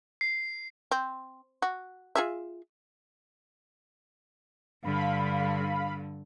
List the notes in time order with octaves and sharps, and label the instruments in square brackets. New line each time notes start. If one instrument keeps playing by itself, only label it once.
[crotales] C7
[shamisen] C4
F#4
F4 G#4 E5
[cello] G2 D3 [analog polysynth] F5 B5